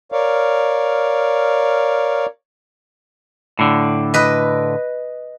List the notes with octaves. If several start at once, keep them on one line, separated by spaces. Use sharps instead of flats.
A#4 C#5 D5 F5
A2 D3
B4 D#5